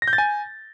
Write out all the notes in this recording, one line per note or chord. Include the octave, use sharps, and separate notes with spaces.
A#6
G6
A6
G#5